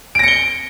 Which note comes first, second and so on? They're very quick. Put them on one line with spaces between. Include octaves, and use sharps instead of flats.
D7 A#6 C#7 G7